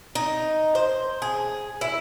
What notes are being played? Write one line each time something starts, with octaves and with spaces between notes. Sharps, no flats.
D#4
C5
G#4
E4